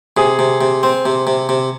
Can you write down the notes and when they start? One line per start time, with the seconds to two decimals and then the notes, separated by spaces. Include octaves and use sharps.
0.17 C3 G#4
0.39 C3
0.61 C3
0.83 C4
1.06 C3
1.27 C3
1.49 C3